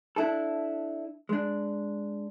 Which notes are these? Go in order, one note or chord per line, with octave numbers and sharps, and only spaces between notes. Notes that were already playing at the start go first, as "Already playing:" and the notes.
D4 E4 A4
G#3 D4